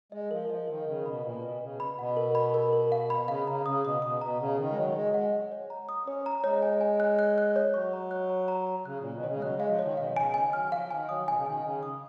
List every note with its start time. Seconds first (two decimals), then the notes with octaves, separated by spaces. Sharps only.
0.12 G#3 D#5
0.31 F3 A#4
0.49 F3 D#5
0.68 D#3 A#4
0.87 C#3 A#4
1.05 B2 B5
1.24 A#2 B4
1.42 B2 B4
1.61 C#3 B4
1.80 B5
1.98 B2 F#5
2.17 A#4
2.35 B5
2.54 A#4
2.73 A#4
2.92 F5
3.10 B5
3.28 C#3 F5
3.47 C#3 A#5
3.66 C#3 D#6
3.84 B2 D#6
4.02 B2 D#6
4.21 B2 A#5
4.39 C#3 F#5
4.58 D#3 A#4
4.71 G#3
4.77 F#3 D#5
4.95 G#3 D#5
5.14 G#3 F#5
5.33 F#5
5.52 C#5
5.70 A#5
5.89 D#6
6.07 C#4 C#5
6.26 A#5
6.44 G#3 C#5
6.62 G#5
6.81 G#5
7.00 F#6
7.19 F#6
7.38 F#6
7.56 C#5
7.74 F#3 C#6
7.93 A#5
8.11 F#6
8.30 A#5
8.48 A#5
8.67 A#5
8.85 C#3 F#6
9.00 A#2 C#5
9.14 B2
9.21 D#3
9.24 C#3 C#5
9.37 G#3
9.42 F#3 F#6
9.55 G#3 F5
9.69 F3
9.79 D#3 C#5
9.97 B2 F5
10.16 C#3 G#5
10.34 D#3 G#5
10.53 F#3 F6
10.72 F3 F5
10.90 D#3 G#5
11.09 F#3 D#6
11.28 B2 G#5
11.37 C#3
11.46 D#3 G#5
11.64 C#3 G#5
11.83 D#6